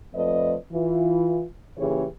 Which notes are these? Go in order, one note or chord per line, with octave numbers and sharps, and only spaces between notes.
F2 F3 A3 B4 D5 D#5
E3 F4
A#2 C#3 E3 G4 G#4 C#5